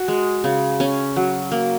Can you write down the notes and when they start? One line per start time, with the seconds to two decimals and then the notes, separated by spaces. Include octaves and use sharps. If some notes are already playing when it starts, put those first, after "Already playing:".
Already playing: F#4
0.08 G#3
0.44 C#3
0.80 C#4
1.16 F#3
1.52 A#3